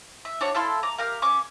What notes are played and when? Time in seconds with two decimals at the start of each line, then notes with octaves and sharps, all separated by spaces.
0.25 E5
0.41 D4 F#4 C#5
0.54 E4 A4 F5 C6
0.83 A#5 D6
0.98 G4 A#4 F5
1.22 C#4 C#6 D6